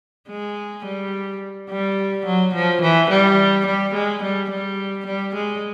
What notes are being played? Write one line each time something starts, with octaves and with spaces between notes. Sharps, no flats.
G#3
G3
G3
F#3
F3
E3
G3
G3
G#3
G3
G3
G3
G#3